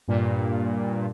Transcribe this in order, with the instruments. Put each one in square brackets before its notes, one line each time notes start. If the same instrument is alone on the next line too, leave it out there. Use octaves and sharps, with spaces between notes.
[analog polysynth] G2 A#2